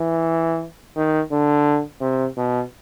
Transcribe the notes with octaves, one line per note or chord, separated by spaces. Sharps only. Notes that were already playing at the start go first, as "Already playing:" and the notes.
Already playing: E3
D#3
D3
C3
B2